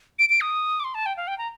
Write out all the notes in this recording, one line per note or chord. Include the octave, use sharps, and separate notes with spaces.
D7
D7
D#6
D6
C6
A5
G5
F5
G5
A#5